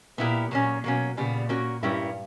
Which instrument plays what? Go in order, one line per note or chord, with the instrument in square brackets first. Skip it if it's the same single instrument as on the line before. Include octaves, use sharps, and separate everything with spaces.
[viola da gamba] A#2 [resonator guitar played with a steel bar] B3 E4 G4 A#4
[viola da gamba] A#2 [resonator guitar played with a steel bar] F#3 A#3 C#4
[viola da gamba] B2 [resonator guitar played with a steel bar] F#3 A#3 C#4
[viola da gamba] A#2 [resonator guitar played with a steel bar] C#3 G3 B3
[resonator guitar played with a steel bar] A#3 C#4 F#4 A#4
[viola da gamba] G2 [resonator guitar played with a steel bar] G3 C#4 E4 G4 A#4